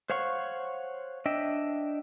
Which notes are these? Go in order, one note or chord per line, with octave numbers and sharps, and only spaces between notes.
C5 C#5 F5 F#5 C#6
D4 D#5 E5 G5